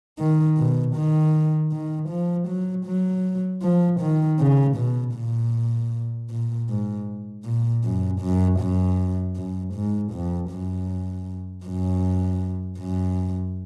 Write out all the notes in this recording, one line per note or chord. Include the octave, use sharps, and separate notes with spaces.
D#3
B2
D#3
D#3
F3
F#3
F#3
F3
D#3
C#3
B2
A#2
A#2
G#2
A#2
F#2
F#2
F#2
F#2
G#2
F2
F#2
F#2
F#2